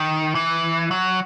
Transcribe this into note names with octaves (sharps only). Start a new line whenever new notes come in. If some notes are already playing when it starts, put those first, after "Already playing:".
Already playing: D#3
E3
F#3